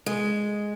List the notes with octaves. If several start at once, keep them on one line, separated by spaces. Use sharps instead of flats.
G#3